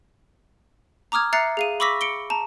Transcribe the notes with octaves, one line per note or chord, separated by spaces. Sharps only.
A#5 D6 D#6 F6 G#6
E5 A#5 F#6 A6 C7 C#7
G#4 F5 D#7
B5 C#6 D6 E6 A#6 B6
C#7 D7 G7
A5 A#5